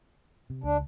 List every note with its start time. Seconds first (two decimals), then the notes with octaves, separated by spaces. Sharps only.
0.50 C3
0.64 C#2 D4